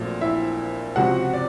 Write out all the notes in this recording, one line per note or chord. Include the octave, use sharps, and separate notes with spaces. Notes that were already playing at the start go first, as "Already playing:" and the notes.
Already playing: A#1 A#2 F#3 A3 C4
E4 E5
C#2 C3 F3 F#4 F#5
D5